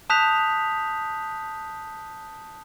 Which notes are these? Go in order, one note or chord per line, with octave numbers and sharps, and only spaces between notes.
A5 D#6 F#6 G6 B6 F7